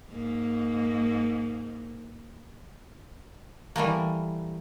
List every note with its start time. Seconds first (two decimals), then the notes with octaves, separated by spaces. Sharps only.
0.11 G#2 A#3
3.76 E3 G3 A3 A#3